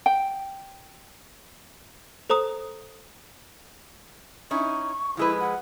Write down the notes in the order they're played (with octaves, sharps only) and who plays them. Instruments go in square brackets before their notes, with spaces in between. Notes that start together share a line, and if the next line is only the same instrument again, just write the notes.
[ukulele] G5
[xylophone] A4 C5 A#5 D#6
[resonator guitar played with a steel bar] C#4 D#4 E4 [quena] C#6
[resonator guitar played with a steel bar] F3 G#3 B4 [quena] E4
[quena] F#5